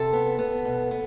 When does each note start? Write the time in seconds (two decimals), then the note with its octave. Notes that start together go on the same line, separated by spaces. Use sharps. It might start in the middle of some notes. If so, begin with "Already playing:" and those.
Already playing: C3 A4
0.13 B3
0.39 B3
0.65 B2
0.91 B3